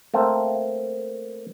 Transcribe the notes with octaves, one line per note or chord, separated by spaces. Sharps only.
A3 A#3 C4